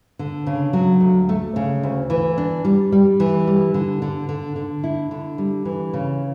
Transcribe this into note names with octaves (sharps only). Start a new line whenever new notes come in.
D3
C#3
F#3
D2
A3
C#3
D2
E3
D4
G3
G3
E3
G3
D3
D3
D3
D3
E4
D3
G3
E3
C#3